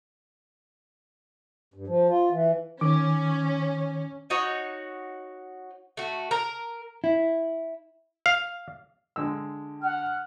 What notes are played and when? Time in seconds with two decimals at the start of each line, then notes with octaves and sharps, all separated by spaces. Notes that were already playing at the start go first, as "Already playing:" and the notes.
1.74 G2
1.87 F3
2.09 F4
2.31 E3
2.81 D#3 C#4 D6
4.30 D#4 F#4 C#5
5.97 A3 F#4
6.31 A#4
7.04 E4
8.26 F5
9.16 D3 G#3 E6
9.82 F#5 F6